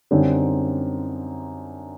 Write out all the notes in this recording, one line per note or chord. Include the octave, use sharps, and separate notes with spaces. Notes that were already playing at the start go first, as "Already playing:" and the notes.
F#2 D3 G3 C4 D#4